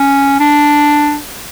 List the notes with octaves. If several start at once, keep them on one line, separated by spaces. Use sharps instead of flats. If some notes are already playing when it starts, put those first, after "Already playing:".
Already playing: C#4
D4